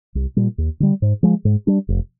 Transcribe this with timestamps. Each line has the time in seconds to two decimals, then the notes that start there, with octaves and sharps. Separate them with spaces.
0.15 C2
0.37 A#2 G3
0.58 D#2
0.80 D3 G3
1.02 G#2
1.23 F3 G#3
1.45 G#2
1.67 G3 D4
1.89 F1